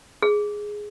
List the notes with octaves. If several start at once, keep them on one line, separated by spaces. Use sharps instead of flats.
G#4